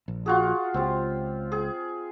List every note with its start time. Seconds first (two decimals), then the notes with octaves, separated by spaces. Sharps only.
0.08 A#1
0.26 F4 F#4 G#4
0.74 C#2 C4 G4
1.52 G#4